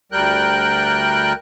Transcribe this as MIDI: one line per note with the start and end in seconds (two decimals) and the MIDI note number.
0.12 1.33 38
0.12 1.33 55
0.12 1.33 70
0.12 1.33 79
0.12 1.33 90